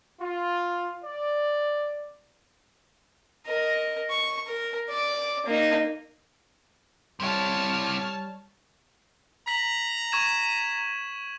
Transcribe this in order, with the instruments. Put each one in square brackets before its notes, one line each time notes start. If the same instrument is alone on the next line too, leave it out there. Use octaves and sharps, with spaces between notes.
[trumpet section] F4
D5
[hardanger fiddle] A#4 D#5
C#6
A#4
D5 D6
A#3 D#4
[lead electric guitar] C3 E4 [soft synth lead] G3 [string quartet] C#5 A5 F6
[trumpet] A#5 [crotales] B6 F#7
[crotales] C#6 G#6 E7